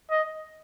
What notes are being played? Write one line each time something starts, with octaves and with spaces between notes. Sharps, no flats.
D#5